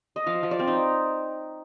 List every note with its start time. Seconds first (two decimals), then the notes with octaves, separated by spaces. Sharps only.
0.16 D#5
0.27 F3 F5
0.43 F3
0.51 D5
0.59 C4
0.67 D#4